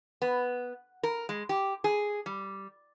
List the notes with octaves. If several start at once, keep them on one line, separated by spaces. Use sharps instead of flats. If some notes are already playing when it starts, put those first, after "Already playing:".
B3
A#4
G#3
G4
G#4
G3